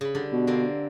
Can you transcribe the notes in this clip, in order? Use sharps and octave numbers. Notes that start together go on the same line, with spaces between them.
C#3 B5
D3 G3 D4
B2
D3 A#3 C4